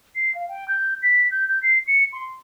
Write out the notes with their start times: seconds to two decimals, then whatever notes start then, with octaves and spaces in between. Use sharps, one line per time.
0.15 C7
0.35 F5
0.49 G5
0.68 G6
1.02 B6
1.31 G6
1.48 G6
1.63 C7
1.87 C#7
2.13 C6